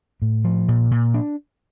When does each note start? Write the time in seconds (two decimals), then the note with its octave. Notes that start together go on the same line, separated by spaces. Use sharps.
0.22 A2
0.44 F3
0.68 A#2
0.91 A#2
1.14 D4